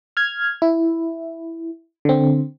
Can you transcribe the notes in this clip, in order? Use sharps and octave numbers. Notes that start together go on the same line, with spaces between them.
F6 G#6
E4
D3 C4